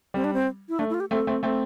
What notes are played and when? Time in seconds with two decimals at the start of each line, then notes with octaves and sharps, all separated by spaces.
0.14 G3 C4
0.24 D4
0.34 C4
0.69 E4
0.79 A3 D4
0.90 E4
0.94 F4
1.00 G4
1.10 A3 C4 A4
1.27 A3 C4
1.43 A3 C4